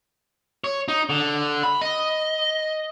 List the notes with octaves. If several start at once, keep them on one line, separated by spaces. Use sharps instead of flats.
C#5
D#4
D3
B5
D#5